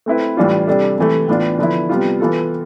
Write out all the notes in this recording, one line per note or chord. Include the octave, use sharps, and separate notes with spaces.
A3 C4 E4 B4
A2 E3 G3 D4 F4
C3 G3 D4 A4
C3 E3 A3
A2 E3 B3 D4 F4
D3 F3 B3 E4
C3 G3 B3 F4
E3 B3 F4 A4